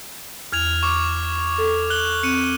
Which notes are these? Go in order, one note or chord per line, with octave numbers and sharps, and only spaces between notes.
E2 F6 G#6 F7
C#6 D6
A4
F#6 F#7 G7
C4 C#7 D#7